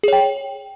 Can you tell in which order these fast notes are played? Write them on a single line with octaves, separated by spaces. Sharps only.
G#4 C#5 G5